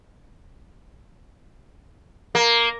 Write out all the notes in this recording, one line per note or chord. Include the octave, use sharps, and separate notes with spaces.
A#3